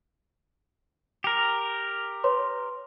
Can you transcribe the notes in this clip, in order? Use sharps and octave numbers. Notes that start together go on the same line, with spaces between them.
G4 A#4
B4 C#5 C6